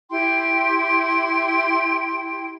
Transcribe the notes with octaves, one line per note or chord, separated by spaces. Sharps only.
E4 G4 G5 C6